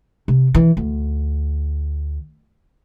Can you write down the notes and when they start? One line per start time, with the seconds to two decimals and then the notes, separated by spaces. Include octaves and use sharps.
0.28 C3
0.55 E3
0.77 D2